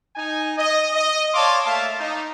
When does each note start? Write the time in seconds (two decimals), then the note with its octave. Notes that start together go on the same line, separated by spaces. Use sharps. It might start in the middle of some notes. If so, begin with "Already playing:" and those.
0.16 D#4 G#5
0.58 D#5
0.95 D#5
1.34 C#5 D5 F5 A5 C6 D6
1.66 A3 A#3 E5 F5 A5
1.99 D#4